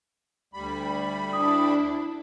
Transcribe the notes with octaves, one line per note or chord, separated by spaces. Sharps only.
D2 G3 B5
D4 E4 D#6